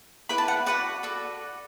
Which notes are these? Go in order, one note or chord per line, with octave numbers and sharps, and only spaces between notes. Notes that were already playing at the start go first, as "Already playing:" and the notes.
E4 B4 D5 B5
A5
F#5
F#4 B4 D5 F#5
F#4 A4 D5